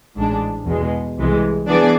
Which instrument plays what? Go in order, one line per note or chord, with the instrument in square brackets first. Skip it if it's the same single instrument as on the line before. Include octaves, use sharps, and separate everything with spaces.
[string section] A1 G#2 G#3 D4
E2 B2 G#3
C2 C3 E3 G#3
E3 B3 D4 G#4 D5